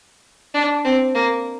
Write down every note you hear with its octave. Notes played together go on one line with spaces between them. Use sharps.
D4
C4
A#3